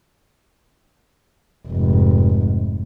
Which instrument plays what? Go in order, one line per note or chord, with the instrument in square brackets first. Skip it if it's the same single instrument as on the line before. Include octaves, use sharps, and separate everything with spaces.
[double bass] F1 G#2